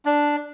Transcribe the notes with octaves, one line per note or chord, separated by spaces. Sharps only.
D4